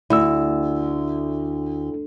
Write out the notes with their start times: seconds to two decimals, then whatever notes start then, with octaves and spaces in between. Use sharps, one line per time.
0.10 D2 E4 E6